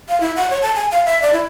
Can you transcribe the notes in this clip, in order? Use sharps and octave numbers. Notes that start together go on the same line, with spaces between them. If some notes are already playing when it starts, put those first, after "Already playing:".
F5
E4
F#5
C#5
A5
G#5
F5
E5
D5
E4